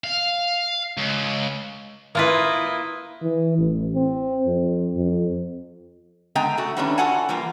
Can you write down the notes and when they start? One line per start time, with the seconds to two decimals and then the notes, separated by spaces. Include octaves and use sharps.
0.04 F5
0.97 C#2
2.15 A#3 E4 F4 B4 D#5
3.22 E3
3.58 A1
3.95 C4
4.46 F2
4.96 F2
6.35 D3 G#3 B3 G5 G#5 A#5
6.58 A3 F#4
6.77 D#3 G3 B3 C#4 D4 E4
6.98 F4 F#4 A4 F#5 G#5 A5
7.29 E3 G3 A#3 F4